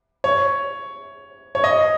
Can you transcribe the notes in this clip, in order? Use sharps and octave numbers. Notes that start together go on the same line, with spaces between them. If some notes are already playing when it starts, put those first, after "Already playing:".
C#5
C#5
D#5